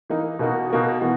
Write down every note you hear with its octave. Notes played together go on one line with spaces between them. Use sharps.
E3 A#3 D#4
B2 A#3 D#4 F#4
B2 A#3 D#4 F#4
E3 B3 F#4